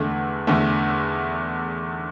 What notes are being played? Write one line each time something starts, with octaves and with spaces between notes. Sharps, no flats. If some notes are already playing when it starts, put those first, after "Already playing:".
Already playing: E2 D3 A3
E2 D3 A3